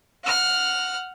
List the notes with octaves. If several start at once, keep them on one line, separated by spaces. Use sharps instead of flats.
F#5 F6